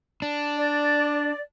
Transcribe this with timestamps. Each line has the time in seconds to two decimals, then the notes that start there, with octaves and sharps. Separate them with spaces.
0.22 D4
0.57 D5